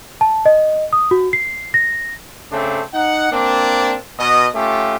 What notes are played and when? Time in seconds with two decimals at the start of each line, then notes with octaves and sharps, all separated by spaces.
0.21 A5
0.46 D#5
0.93 D#6
1.11 F#4
1.33 C7
1.74 A#6
2.52 C#3 A3 C4 D4
2.93 D#4 F#5
3.32 A#3 C4 D4
4.19 B2 D#5
4.55 A3 C#4 F4 G4